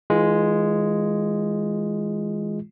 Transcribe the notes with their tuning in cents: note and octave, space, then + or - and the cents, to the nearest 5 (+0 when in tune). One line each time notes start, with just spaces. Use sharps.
E3 -30 G#3 +0 F4 +0